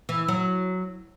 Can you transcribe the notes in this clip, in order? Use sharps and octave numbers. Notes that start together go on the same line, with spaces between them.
E3
F#3